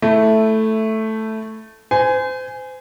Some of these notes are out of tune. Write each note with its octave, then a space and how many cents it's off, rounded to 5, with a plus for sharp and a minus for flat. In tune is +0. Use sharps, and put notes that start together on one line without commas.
A3 +0 E4 +0
C5 -35 G#5 +0